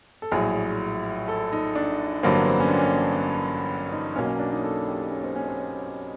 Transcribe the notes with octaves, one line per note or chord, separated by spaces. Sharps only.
A4
A#1 A2 F#3 G#4
A4
D#4
D4
A1 G2 D3 F#3 A#3 C4
B3
C4
C#4
D4
C#4
D#4
B1 B2 F#3 A#3 C#4
C#4
D4
D#4
A4
G4
C#4
C4
C#4
C4
C4